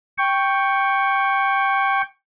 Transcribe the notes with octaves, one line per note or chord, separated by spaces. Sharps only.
G5 C#6